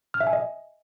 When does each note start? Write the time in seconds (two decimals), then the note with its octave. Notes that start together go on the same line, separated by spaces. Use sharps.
0.14 F6
0.20 E5
0.27 G#5
0.33 D#5